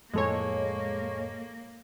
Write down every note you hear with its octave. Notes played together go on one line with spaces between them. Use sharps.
F2 A2 G#3 A#3 A4 C#5